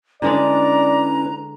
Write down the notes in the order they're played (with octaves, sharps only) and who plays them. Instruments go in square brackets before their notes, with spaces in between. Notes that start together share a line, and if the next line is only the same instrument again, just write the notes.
[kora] D3 G#3 D4 [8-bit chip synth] C#4 E4 B4 [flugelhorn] D5 [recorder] A#5